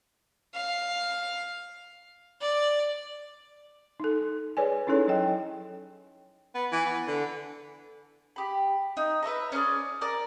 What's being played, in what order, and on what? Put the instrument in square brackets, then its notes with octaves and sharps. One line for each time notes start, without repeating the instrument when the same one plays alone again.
[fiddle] F5
D5
[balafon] D#4 A4
G#4 B4 C#5 D5 G#5
C#4 D#4 E4 G#4 A4 C#5
F#3 C#5 D#5 G5
[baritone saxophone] B3
E3
B3
D3
[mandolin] G4 B5
D#4
B4 C#5 E5 A#5
C#4 G#4 B4 D5
A#4 D5